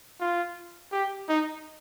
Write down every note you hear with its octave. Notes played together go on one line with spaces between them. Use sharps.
F4
G4
D#4